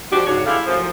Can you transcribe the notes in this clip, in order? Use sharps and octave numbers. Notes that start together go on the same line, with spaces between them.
F3 G#3 D4 F#4 G4
G#2 C#3 D4 F#4 C#5
G#3 E4 G4 A4 F5
F#2 A2 F3